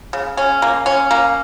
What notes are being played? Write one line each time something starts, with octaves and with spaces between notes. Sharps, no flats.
C#3
C#4
A#3
C#4
A#3